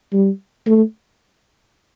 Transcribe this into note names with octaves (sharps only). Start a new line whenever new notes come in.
G3
A3